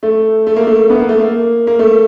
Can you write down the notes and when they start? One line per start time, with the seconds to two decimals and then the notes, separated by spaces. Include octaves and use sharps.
0.03 A3
0.47 A3
0.56 A#3
0.67 A3
0.90 B3
1.00 A#3
1.09 A3
1.20 A#3
1.67 A#3
1.79 A3